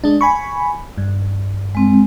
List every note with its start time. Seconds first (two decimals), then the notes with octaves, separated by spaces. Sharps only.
0.04 G#3 D4
0.21 G#5 B5 C#6
0.98 G2
1.75 G#3 C4